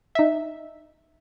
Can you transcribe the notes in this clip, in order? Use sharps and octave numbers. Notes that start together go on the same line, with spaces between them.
D#4 E5